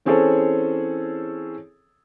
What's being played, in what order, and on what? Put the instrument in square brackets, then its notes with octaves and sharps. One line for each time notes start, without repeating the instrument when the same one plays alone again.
[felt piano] E3 C4 C#4 G#4 A4 C#5